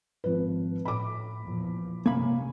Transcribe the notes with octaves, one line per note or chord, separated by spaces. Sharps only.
G#1 F3 B4
A2 B5 D6
E2 A#2 F3
G2 C3 A#3 C#4 B5